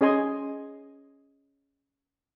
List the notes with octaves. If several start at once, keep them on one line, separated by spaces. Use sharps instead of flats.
C#4 G#4 D#5 G#5 C6